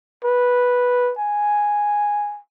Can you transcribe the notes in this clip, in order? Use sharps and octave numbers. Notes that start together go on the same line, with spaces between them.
B4
G#5